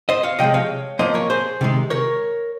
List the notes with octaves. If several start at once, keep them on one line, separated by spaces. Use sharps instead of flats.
C5 D#5
C#5 F5
C3 F3 G#3 D#5 G5
C#5 F5
A#2 F3 A#3 C5 D#5
A#4 C#5
G#4 C5
C3 D#3 G#3
A#4 C#5